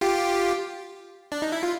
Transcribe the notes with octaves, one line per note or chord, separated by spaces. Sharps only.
F4 G4
D4
D#4
E4
F4